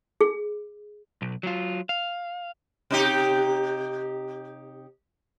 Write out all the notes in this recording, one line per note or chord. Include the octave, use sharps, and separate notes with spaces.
G#4
B1
F#3 F4
F5
C3 D#4 G4